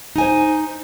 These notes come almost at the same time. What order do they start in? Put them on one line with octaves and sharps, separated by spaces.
D#4 G#5 C5